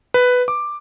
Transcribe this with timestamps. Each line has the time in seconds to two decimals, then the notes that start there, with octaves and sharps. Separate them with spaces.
0.14 B4
0.48 D6